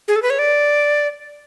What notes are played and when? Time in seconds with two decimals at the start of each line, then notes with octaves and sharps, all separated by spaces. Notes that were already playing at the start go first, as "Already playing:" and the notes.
0.08 G#4
0.16 A4
0.22 B4
0.30 C#5
0.39 D5